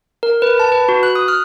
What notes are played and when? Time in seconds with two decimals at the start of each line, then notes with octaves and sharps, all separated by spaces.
0.23 A#4
0.42 B4
0.60 A5
0.72 B4
0.89 F#4
1.03 F#6
1.15 D#6
1.28 F6